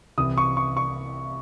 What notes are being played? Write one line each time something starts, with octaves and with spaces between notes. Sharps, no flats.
C2 C3 E3 D#6
C#6
C#6
C#6